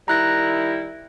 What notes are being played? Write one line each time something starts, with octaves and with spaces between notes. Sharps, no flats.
D#3 G3 E4 A#5 F#6 A#6